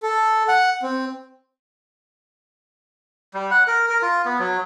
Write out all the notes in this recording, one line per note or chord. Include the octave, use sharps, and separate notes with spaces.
A4
F#5
C4
G3
F#5
A#4
A#4
F4
B3
F#3